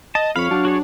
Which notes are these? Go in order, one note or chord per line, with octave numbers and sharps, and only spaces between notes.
D#5 A5
F2 C#5 F5 B5
F#3 D4
F#4 G#4 C#5